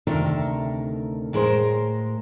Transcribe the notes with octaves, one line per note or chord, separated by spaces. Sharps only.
D2 C3 D#3 A4 A#4 E5
A2 G#3 A#4 C5